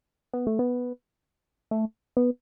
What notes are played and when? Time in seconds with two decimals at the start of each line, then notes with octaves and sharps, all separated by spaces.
0.33 B3
0.47 A3
0.59 B3
1.71 A3
2.17 B3